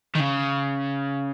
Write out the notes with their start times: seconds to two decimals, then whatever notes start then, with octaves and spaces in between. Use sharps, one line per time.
0.15 D#3
0.20 C#3